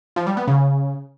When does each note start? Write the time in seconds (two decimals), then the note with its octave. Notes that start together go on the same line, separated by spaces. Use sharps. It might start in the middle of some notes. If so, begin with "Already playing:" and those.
0.16 F3
0.27 G3
0.37 B3
0.47 C#3